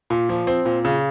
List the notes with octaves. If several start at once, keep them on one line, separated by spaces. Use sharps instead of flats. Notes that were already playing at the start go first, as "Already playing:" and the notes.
A#2
F3
C4
A#2
C#3